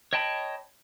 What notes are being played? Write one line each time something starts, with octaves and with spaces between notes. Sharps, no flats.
C#5 D#5 G5 A5 B5